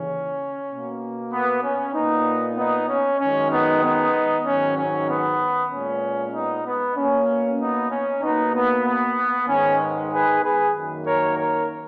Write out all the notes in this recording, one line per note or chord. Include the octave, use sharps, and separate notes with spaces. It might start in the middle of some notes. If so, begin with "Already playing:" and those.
Already playing: D#2 C#3 E3 C#4
B2 A#3
B3
C#4
A#2 A#3 B3 D#4
B3 D#4
C#4
F#2 D#3 G#3 C#4
B3 D#4
B3 D#4
G#2 D#3 F#3 C#4
C#4
B3
A#2 G#3 B3 C#4
B3 D#4
B3
B2 A#3 C#4
B3 D#4
C#4
B2 A#3 B3 D#4
B3
B3
G#2 D#3 G#3 B3 C#4
G#4 B4
G#4 B4
F#2 D#3 A#3
A#4 C#5
A#4 C#5